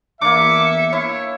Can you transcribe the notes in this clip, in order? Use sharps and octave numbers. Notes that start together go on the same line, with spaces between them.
E2 A#3 D4 E5 D6 C#7
E4 C#5